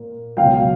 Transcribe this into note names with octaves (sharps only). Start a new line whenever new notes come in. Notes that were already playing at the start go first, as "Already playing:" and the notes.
Already playing: A#2 A#3
C#2 B2 F#3 F5 G5